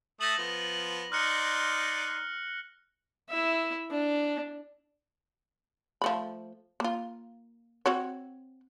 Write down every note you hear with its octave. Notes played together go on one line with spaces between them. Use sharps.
A3 A5 D#6 A#6 F#7
F3 B3
D#4 D5 C6 F6 F#6 C#7
E4 E5
D4
F3 A3 B5
A#3 F4
C4 F#4 C#5